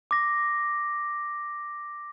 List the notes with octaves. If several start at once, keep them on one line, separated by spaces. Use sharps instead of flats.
D6 A#6